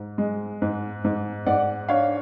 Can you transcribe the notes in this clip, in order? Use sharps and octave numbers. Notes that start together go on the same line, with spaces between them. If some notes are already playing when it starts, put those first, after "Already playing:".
Already playing: G#2
G#3
G#2
G#2
G#2 D5 F#5
D4 C#5 F5